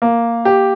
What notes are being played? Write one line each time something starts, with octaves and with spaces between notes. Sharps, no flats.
A#3
G4